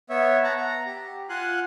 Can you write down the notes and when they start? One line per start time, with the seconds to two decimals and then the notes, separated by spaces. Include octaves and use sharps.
0.10 B3 C#5 E5
0.44 F#5 A5 A#5
0.57 A#5
0.86 G4
1.29 F4 F5 F#5 G#5 C6 F#6